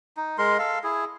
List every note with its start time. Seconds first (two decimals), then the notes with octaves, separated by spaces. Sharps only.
0.17 D#4
0.38 G#3 A#4 C6
0.59 A4 F5
0.84 E4 G#4